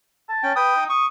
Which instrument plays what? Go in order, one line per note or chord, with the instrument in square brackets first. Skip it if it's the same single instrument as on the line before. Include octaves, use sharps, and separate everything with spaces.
[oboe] A5
[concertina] C#4 G5
[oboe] B4 [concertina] G5 D#6
[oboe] D#4
[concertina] C#6 [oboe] D#6